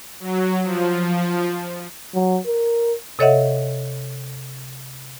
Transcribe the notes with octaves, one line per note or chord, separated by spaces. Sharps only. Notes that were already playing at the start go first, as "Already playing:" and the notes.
F#3
F3
F#3
A#4
C3 A4 C#5 D#5 E5 F#5